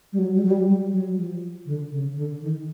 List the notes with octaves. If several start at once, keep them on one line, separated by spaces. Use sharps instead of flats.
G3
F#3
G3
F#3
G3
G3
F#3
F3
D3
C#3
D3
D#3